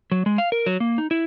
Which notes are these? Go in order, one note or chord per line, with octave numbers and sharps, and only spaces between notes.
F#3
G#3
F5
A#4
F#3
A#3
D#4
E4